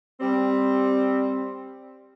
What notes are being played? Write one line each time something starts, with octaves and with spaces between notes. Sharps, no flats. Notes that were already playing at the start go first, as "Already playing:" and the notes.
G3 C4